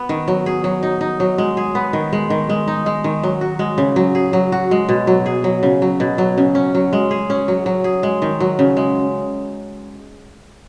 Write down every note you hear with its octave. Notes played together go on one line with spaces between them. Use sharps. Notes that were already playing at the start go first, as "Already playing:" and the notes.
Already playing: B3
D#3
F#3
G#4
F#3
D#4
D#4
F#3
G#3
G#4
B3
D#3
G#3
D#3
G#3
D#4
G#3
D#3
F#3
F#4
G#3
C#3
F#3
G#4
F#3
F#4
G#3
B2
F#3
G#4
F#3
C#3
F#3
B2
F#3
C#3
C#4
F#3
G#3
G#4
C#4
F#3
F#3
G#4
G#3
D#3
F#3
C#3
G#3